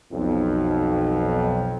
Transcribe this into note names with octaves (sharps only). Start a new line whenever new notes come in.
B1 F2